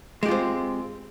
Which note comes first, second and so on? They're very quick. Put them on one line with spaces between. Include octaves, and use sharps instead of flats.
G#3 G4 F4 C4